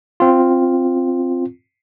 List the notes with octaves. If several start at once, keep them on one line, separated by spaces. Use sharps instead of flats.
C4 F4